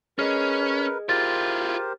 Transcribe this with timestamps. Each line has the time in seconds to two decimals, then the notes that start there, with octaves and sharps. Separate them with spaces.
0.19 C#4 G#4 A#4 B4 D#5 F6
1.09 E4 F4 G4 A#4 C5 A6